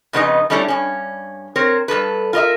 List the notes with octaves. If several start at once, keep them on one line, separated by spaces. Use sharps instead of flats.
F2 C#3 B3 D4 D#4 D#5
G3 A3 C#4 D4 E4
G2 C#4
C4 A#4 C5 C#5
G2 A#2 A4 B4
F4 A#4 D#5 E5